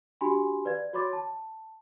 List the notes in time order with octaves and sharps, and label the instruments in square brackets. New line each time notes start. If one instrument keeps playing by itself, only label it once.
[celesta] D4 F#4 G4 G#5 B5 C6
B4 D5 F5 G#6
F#4 C#5 B5 C6 D6 A6
A5